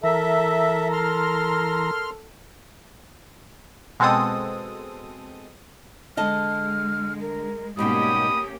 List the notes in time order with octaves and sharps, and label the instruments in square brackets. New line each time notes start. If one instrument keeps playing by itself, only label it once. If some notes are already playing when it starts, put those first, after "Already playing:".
[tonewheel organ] E3 A#5 [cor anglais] A4 [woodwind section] A#4 [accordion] E5
[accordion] C6 F6
[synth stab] B2 G#3 C4 A4 D#6
[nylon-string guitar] D3 D#5 A5 [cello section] G#3 [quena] F6
[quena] A#4
[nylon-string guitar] G#2 B2 G3 [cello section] A#3 C#4 G4 [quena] B5 [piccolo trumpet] D#6